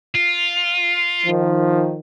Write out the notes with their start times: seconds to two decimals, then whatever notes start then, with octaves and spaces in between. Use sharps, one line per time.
0.14 F4
1.26 D#3 F3